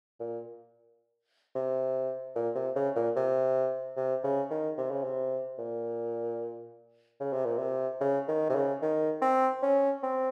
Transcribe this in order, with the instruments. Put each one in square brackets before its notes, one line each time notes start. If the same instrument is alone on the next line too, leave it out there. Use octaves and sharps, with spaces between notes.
[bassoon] A#2
C3
A#2
C3
C#3
A#2
C3
C3
C#3
D#3
C3
C#3
C3
A#2
C#3
C3
A#2
C3
C#3
D#3
C3
C#3
D#3
C4
C#4
C4